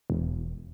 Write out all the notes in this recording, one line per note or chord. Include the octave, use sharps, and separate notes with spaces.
E1